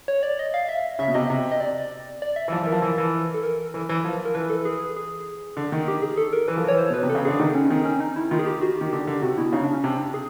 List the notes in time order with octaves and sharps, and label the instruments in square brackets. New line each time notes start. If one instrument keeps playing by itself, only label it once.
[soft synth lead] C#5
D5
D#5
F5
E5
[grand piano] C#3 [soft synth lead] E5
[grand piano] B2
[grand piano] C3 [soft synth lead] D#5
[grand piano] C3
[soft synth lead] D#5
D5
D5
E5
[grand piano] E3
[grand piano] F3 [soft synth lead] D5
[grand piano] E3
[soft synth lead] A#4
[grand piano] F3
E3
E3
[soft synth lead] A4
A#4
[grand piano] E3
E3
F3
[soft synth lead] A#4
[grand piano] E3 [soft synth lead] B4
[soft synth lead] A4
G#4
G#4
[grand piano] D3
D#3
[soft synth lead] G4
G#4
A4
A#4
[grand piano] E3 [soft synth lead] B4
[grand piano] F3
[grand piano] E3 [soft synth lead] C#5
[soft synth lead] C5
[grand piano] B2 [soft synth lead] B4
[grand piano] C3
[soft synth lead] A4
[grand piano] C#3
[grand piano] D3 [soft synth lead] G#4
[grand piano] D#3 [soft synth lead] D#4
[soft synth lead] C#4
[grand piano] D#3 [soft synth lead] C4
[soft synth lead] C#4
D#4
E4
[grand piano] D#3 [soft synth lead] F4
[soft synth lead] G#4
G4
F#4
[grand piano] D#3 [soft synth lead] G4
[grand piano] D3 [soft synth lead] G4
[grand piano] D3 [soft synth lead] G4
[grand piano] C3 [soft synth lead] F#4
[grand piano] B2 [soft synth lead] E4
[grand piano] C#3 [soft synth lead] D#4
[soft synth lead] D4
C#4
[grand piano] C3 [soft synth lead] D4
[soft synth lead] G#4